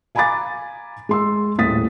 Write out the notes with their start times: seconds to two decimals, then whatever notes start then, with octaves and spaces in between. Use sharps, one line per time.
0.15 F5 G#5 A#5 B5 D6 A6
1.09 G#3 C6 E6
1.58 D#1 A2 D#6 A6 B6